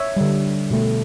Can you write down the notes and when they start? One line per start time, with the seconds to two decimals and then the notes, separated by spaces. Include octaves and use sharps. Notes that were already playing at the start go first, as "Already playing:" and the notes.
Already playing: C#5 E5
0.17 D3 G3
0.71 B2 A3